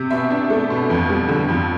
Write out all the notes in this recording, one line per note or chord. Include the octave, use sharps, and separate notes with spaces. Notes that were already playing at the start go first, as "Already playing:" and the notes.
Already playing: C3
B2 E5
D4
A3
B2
F2
G3
D3
F2